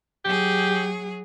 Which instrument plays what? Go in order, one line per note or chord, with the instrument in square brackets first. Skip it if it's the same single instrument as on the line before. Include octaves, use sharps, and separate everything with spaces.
[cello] F#3 G#4 [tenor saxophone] G4